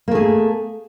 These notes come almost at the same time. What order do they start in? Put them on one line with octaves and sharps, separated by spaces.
A#3 A3 G#4